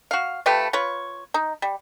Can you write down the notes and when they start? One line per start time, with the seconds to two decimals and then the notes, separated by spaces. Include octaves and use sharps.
0.11 F#4 F5
0.46 F3 A3 G4 B4
0.73 F4 B4 C#5
1.34 D#4
1.62 G3